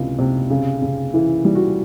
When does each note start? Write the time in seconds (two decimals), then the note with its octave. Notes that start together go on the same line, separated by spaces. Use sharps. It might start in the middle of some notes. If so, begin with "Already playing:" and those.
Already playing: C#2 C3 E3
0.19 C3
0.50 C#3
0.82 C#3
1.14 E3 E4
1.45 G3
1.55 F#4